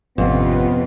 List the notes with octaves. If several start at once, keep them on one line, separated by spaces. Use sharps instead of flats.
G#1 F2 C3 B3 C#4 F4